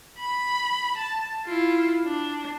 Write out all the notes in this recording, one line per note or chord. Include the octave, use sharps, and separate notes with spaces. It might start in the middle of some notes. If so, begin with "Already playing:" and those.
B5
A5
E4 F4
D4